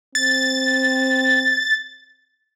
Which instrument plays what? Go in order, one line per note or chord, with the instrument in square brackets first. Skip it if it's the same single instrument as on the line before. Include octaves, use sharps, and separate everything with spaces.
[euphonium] C4 [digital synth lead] A6